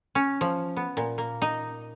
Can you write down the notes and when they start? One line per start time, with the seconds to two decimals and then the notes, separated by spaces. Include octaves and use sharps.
0.15 C#4
0.41 F3
0.77 B3
0.97 A#2
1.18 A#3
1.42 D#4